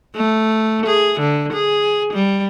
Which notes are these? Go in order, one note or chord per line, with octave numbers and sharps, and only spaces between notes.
A3
G#4
D3
G#4
G3